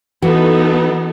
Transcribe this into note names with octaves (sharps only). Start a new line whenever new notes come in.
E3 B3 D#4 F#4 A4